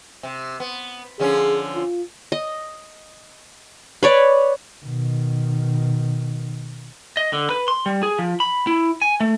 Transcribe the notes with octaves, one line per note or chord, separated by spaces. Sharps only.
C3
B3
D3 F3 C#4 G#4
F4
D#5
B4 C#5 D5
B2 D#3
D#5
D3
B4
C6
G3
G#4
F3
B5
E4
G#5
A3